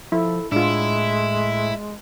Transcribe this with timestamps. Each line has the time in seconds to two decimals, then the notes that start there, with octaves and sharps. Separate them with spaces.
0.12 F3 E4 A4
0.52 A2 G#3 D4 E4 F4